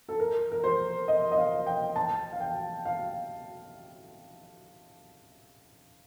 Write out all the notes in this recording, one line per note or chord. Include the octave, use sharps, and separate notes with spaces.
A4
A#4
A#4
C5
D#5
D#5
F5
G5
A5
F5
G5
F5